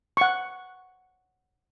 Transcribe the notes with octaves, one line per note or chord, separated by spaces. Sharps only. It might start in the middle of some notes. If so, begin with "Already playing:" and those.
F#5 C#6